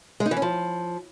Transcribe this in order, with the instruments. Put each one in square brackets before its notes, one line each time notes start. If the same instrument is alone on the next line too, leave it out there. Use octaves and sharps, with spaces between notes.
[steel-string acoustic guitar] G#3
D#4
E3
C#4
F3